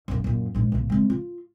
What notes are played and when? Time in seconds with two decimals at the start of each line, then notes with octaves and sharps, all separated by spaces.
0.08 B1 F#2
0.24 F#2 A#2
0.55 A#1 G#2
0.72 B1 A2
0.90 C3 G#3
1.10 F4